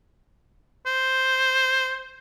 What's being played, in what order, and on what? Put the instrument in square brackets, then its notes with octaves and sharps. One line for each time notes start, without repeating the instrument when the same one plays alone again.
[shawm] C5